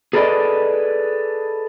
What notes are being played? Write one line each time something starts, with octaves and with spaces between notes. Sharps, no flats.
G#4 A4 B4 D5 D#5